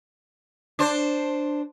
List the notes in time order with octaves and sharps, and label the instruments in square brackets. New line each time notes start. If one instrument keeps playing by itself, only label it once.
[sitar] D4 C5